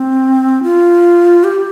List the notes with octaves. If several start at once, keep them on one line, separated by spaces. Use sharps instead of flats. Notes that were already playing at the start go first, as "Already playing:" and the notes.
Already playing: C4
F4
G4